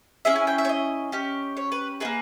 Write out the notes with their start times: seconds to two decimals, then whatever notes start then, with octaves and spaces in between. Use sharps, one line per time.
0.25 C#4 E4 G#4 E5
0.36 G#5
0.47 G5
0.58 E5
0.65 C#5
0.69 D#5
1.12 C#4 G4
1.57 C#5
1.72 B4
2.00 D#4 G#4 B4
2.05 A#3